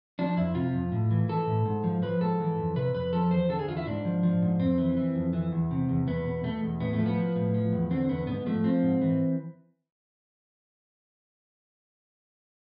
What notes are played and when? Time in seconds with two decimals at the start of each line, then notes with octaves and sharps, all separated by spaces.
0.19 F3 D4
0.37 F2 E4
0.55 C3 F4
0.73 F2
0.92 A2
1.11 E3
1.29 E3 A4
1.47 A2
1.65 G#2
1.84 F3
2.02 F3 B4
2.20 G#2 A4
2.40 E3
2.58 F2
2.76 C3 B4
2.94 F2 B4
3.13 F3 A4
3.31 E2 C5
3.49 D3 A4
3.59 G#4
3.68 E2 F4
3.77 E4
3.86 G#2 D4
4.05 F3
4.23 F3
4.42 G#2
4.60 F2 C4
4.78 E3
4.97 E3
5.15 F2
5.33 E3
5.52 E2
5.71 C3
5.89 E2
6.07 E2 B3
6.25 B2
6.44 B2 A3
6.63 E2
6.80 A2 B3
6.93 A3
6.98 F3
7.06 B3
7.17 F3
7.36 A2
7.54 F3
7.72 E2
7.91 D3 C4
8.09 E2 B3
8.27 G#2 B3
8.46 F3 A3
8.64 F3 C4
8.83 G#2
9.01 E3